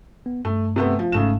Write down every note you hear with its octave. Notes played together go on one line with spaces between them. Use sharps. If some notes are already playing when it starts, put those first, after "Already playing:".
B3
G2 A3
C3 A3 B3
F3
G1 G#2 C#3 A3 E7